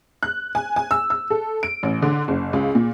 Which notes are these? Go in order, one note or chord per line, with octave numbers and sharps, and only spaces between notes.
F#6
G#5
G#5
E6
E6
A4
D7
A1
D3
F#1
C#2
A#2